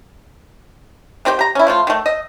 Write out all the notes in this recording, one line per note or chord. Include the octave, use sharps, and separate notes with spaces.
D#3 C4 G4 G5
G4 A#5
C#4 E4
F3 A3 F4
D#3 A3
D#5